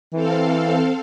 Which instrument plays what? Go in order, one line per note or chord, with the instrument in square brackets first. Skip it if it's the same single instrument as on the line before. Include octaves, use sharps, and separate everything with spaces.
[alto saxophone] E3 [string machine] C4 A4 F5